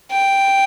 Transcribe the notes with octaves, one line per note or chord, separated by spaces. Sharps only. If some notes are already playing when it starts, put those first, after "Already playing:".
G5